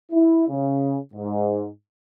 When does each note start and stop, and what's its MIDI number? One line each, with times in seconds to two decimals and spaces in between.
0.12 0.46 64
0.49 0.97 49
1.14 1.68 44